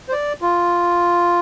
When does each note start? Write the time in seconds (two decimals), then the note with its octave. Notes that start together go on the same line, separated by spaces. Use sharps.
0.08 C5
0.12 D5
0.42 F4